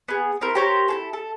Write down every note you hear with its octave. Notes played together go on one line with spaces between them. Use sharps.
B3 G#4
C4 E4 A#4
G4 A#4 C5 C#5
E4 G#4 A4
A4